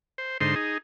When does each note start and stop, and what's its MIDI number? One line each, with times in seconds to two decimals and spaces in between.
0.18 0.38 72
0.41 0.55 44
0.41 0.55 50
0.41 0.55 63
0.41 0.55 72
0.41 0.55 84
0.56 0.78 63
0.56 0.78 68